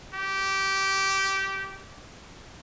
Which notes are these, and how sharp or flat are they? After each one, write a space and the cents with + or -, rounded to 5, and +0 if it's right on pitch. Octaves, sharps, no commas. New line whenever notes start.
G4 -15